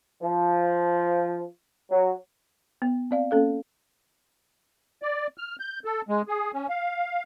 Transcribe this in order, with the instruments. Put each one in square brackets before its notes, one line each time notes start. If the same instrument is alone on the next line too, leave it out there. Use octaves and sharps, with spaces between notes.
[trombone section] F3
F#3
[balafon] B3
C4 D5 F5
A#3 C#4 A4 F5
[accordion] D5
F6
G6
A4
G#3
G#4
C#4
F5